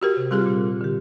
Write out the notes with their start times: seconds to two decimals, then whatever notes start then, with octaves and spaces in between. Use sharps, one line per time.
0.02 F#4 G4 A#4
0.17 C3
0.31 G3 C4 F4 G4 G#4
0.46 A#2
0.81 D3 G4